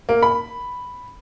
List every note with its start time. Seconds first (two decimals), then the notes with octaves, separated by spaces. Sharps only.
0.09 A#3
0.23 B5